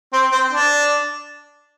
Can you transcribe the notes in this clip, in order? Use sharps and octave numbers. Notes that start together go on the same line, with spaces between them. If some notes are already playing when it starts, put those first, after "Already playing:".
C4
C4
D4